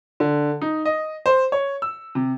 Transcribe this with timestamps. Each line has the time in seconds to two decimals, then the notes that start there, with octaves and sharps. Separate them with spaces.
0.20 D3
0.61 D#4
0.85 D#5
1.26 C5
1.52 C#5
1.82 E6
2.15 C3